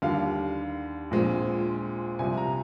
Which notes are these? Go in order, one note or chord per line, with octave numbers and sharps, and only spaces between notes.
D#2 D3 G3 F5
A#1 A#2 G#3 C4
C2 C3 F3 G#5
A#5